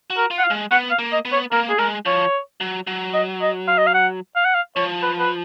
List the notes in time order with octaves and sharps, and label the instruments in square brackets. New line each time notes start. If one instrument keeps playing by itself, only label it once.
[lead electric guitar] F#4
[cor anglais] A#4
[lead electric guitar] F4
[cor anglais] F#5
F5
[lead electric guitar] G#3
[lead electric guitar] B3 [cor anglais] F#5
[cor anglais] F5
[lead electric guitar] A#3
[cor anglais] D#5
[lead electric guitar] B3
[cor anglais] C#5
[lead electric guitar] A#3 [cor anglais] A#4
[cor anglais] G#4
[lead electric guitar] G#3 [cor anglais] A#4
[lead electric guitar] F3 [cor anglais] C#5
[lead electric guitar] F#3
F#3
[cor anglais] D#5
D#5
F5
D#5
F5
F#5
F5
F#5
F5
[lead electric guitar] F3 [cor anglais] C#5
[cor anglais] B4
B4